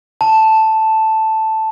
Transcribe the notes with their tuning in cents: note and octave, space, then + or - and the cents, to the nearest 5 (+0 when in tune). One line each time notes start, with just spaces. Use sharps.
A5 +0